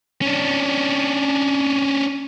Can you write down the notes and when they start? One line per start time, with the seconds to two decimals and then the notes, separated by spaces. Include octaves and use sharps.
0.22 C#4 D4